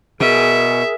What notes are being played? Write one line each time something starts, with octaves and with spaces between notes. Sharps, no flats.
B2 G#4 A#4 E5